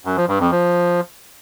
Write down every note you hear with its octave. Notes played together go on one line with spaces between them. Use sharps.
F#2
F3
G2
F2
F3